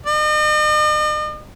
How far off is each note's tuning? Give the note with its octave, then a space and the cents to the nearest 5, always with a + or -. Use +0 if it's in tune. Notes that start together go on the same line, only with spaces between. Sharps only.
D#5 -45